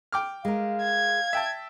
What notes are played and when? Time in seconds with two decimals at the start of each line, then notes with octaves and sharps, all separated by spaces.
0.12 G5 D6 F6
0.45 G#3 A#4 F5
0.83 G#6
1.33 E5 G5 A5